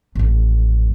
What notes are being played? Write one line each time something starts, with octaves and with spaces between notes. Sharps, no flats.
A1 F2